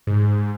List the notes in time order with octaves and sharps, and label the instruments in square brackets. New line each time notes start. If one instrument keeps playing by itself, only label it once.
[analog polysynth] G#2